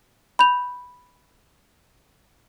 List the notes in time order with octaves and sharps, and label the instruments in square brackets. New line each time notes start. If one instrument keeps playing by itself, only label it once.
[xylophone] B5 G6 F7